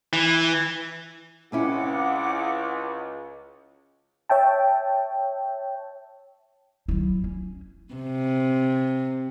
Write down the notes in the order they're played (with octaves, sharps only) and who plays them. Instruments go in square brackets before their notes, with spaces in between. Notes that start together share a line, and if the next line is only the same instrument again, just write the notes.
[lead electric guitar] E3
[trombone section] C#2 [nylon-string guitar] C4 C#4 E4 [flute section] F#5 D6
[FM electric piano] C#5 E5 G5 A5
[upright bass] F#3 E4
C#4
[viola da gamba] C3